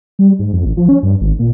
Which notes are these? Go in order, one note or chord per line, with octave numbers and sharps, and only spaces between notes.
G3
G#2
F2
A1
F3
C#4
G2
G#1
A#2